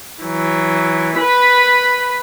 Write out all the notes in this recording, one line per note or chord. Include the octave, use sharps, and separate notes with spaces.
E3 F#3
B4 B5